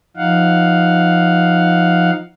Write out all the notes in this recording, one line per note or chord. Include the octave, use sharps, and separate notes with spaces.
F3 D#4 F5 F#5